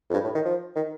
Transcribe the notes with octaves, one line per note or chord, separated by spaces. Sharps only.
F2
G2
A2
D#3
F3
D#3